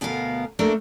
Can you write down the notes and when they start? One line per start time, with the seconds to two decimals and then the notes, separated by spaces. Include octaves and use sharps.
0.01 D2 B2 B3 A#4 F5
0.59 A3 A#3 D4 A4 A#4